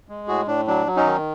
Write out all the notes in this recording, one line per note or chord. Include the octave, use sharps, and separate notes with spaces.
G#3
A2 F#4 G#4
A2 D4
F#3 D4
F#3
C#4 D#4
D#3